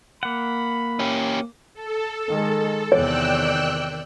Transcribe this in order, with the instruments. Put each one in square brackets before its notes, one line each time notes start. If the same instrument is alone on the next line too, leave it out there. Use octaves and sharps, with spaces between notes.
[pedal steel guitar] A#3 F#5 [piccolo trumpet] B5
[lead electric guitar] C#4 G4
[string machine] A4
[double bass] D#3 G#3
[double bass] E2 C3 [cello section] D#3 D5 [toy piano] C#5 [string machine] G5 E6 F#6